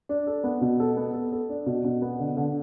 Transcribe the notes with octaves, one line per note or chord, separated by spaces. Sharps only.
D4
A4
B3
B2
A4
B3
A4
A4
D4
B2
B2
B3
D3
D3